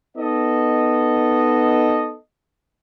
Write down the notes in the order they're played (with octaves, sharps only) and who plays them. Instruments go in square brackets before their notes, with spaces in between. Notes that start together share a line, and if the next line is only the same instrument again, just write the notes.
[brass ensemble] B3 D#4 A4 D#5